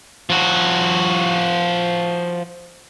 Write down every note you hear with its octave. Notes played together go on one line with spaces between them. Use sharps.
F3 F#4